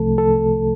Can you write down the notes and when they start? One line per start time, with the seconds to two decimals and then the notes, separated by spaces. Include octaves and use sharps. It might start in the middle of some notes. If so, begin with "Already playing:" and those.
Already playing: C2 C3 F3 A3 A4
0.18 A4